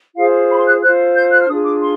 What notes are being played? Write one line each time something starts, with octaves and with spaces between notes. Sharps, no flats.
F4 G#4 C5 F5
B5
C6
F#6
F4 A4 C5 F#6
G6
F#6
F6
D4 F4 G#4 D#6
D6
C6